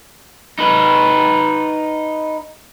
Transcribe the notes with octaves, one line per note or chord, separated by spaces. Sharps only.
D#4 B4